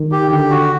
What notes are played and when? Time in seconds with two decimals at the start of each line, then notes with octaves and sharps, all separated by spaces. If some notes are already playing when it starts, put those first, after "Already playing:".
Already playing: D#3
0.12 G4
0.31 D3 G4
0.51 F#4